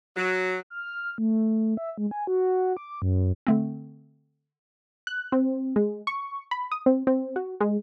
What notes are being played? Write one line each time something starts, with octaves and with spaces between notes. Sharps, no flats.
F#3
F6
A3
E5
G#3
G#5
F#4
D6
F#2
D3 A3 C4
F#6
C4
G#3
C#6
B5
D#6
C4
C4
F#4
G#3